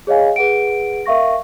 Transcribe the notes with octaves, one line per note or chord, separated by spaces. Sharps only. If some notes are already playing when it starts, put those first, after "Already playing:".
G#4 C#5 D#5 F5 G#5
G#4 B4 F#5 D7
A#4 E5 F5 C#6 A#6